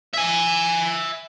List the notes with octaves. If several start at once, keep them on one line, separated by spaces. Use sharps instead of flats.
E5 G#5